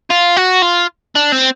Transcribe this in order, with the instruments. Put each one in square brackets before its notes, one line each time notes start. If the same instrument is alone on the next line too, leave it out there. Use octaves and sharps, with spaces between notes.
[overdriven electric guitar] F4
F#4
F4
D4
C4